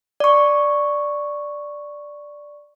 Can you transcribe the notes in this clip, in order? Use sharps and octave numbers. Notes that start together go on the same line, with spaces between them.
D5 C#6